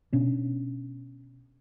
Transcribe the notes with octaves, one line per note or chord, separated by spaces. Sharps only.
B2 C#4 D4